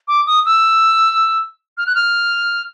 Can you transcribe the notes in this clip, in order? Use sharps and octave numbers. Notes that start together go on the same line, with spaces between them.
D6
D#6
E6
F6
F#6
F6